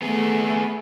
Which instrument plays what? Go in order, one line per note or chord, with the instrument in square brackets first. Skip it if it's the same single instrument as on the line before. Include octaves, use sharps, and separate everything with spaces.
[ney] A3 [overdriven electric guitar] B3 G#4